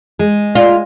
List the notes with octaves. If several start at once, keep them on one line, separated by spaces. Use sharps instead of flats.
G#3
F4